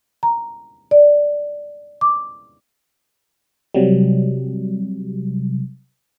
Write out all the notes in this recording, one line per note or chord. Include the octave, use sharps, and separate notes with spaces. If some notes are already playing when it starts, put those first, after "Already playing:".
A#5
D5
D6
C3 F#3 G3